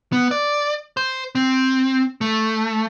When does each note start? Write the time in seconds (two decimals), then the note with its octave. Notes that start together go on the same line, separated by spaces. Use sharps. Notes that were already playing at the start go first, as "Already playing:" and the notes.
0.12 B3
0.31 D5
0.97 C5
1.35 C4
2.21 A3